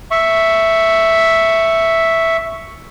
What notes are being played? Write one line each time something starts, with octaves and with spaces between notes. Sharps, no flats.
E5 C#6